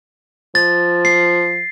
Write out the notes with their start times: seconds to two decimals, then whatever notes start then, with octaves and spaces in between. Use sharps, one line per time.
0.55 F3 A6
1.05 C7